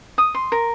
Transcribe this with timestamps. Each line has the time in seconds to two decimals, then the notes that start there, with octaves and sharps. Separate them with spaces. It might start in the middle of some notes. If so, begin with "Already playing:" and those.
0.18 D#6
0.35 C6
0.52 A#4